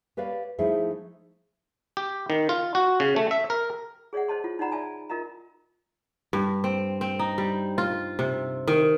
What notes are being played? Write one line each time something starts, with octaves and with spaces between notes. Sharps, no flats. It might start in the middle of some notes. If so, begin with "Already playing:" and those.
G4 B4 C#5 D5 F5
F3 A3 D#4 E4 G#4
G4
D#3
F4
F#4
C#3
A3
E5
A#4
G#4 C#5 D5 E5 F#5
C5 C#5 D#5 A5 C6
F4
D#4 C#5 D5 F#5 A#5 B5
D5 E5 G#5 A5
F4 A#4 D#5 E5 A#5
G2
C4
C4
D#4
G3
F4
C3
D#3